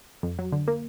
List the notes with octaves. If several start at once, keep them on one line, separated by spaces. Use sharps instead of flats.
F2
F#3
D3
A#3